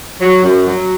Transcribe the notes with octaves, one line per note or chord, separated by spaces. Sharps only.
F#3
F#2
F#3